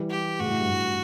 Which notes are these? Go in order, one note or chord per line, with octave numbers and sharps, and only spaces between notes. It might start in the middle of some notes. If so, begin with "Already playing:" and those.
Already playing: E3 G3
G4
A2 C#3 F#4
A2
G2
A2